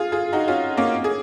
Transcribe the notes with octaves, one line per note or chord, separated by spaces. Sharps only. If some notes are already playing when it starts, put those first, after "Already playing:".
Already playing: F4 G#4
F4 G#4
D#4 F#4
C#4 F4
A#3 C#4
G#4